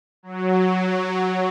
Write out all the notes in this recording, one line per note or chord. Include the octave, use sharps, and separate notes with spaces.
F#3